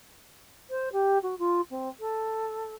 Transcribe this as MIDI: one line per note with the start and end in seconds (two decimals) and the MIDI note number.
0.70 0.89 72
0.92 1.18 67
1.23 1.38 66
1.39 1.61 65
1.71 1.89 60
2.00 2.75 69